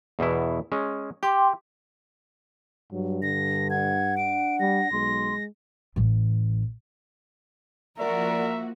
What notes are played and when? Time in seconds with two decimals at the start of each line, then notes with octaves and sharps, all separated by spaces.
0.19 E2 B2 E4
0.72 G#3 C#4
1.23 G4 G5 C6 D6
2.92 G2 F#3
3.22 D3 A#6
3.70 F#5 G#6
4.17 D4 D7
4.60 G3 A#6
4.92 B1 G#3 C6
5.96 A1 E3
7.99 F3 A#3 F#4 A#4 D5 E5